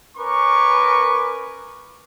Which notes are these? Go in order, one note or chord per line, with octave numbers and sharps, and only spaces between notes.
C#4 A#4 B4 C#6 D6